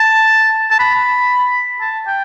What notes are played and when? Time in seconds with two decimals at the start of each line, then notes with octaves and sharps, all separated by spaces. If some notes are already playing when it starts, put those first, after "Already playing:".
Already playing: A5
0.71 A5
0.79 B5
1.81 A5
2.07 G5